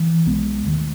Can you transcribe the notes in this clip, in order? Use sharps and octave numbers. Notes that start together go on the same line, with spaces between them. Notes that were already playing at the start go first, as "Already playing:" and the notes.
Already playing: E3
B1 B2 G#3 B3
D#2 D#3 A3